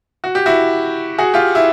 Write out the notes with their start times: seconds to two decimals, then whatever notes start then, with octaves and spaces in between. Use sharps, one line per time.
0.24 F#4
0.35 G4
0.46 E4 F#4
1.18 F#4 G#4
1.34 F4 G4
1.55 E4